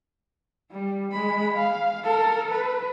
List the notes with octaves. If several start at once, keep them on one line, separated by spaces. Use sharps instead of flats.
G3
G#3 B5
F5
A4 A#4
B4